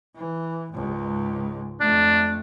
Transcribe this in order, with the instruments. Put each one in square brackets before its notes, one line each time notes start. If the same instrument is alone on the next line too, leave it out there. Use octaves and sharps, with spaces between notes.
[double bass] E3
C#2 G#2
[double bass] F2 A3 [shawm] D4